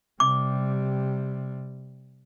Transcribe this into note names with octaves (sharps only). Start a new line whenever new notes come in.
C3 G3 D6